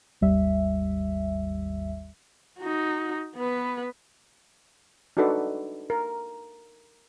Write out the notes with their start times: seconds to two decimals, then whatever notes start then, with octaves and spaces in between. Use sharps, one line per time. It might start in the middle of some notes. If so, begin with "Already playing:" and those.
0.21 G#1 D#2 G3 E5
2.59 D#4 F#4
3.36 B3 B4
5.17 D4 D#4 F#4 A4 B4 D5
5.90 A#4